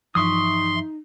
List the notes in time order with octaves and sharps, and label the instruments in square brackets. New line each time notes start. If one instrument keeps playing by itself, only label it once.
[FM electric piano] G2 E3 F3 [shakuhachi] D#4 [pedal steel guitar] E5 C#6 D#6 [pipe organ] C6